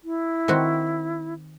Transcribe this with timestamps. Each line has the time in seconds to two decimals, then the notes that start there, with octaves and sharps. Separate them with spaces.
0.04 E4
0.48 D#3 C4 F#4